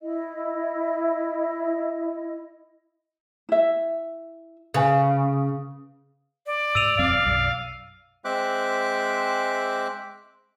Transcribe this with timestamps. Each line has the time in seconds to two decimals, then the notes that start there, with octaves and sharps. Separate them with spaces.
0.01 E4 D#5
3.49 E4 E5
4.74 C#3 B4 G#5
6.46 D5
6.75 G#2 E6 D#7 F7
6.99 E1 F#2 C4 F5
7.25 B1 F#2
8.25 G#3 C4 C5 E5 D6 F#6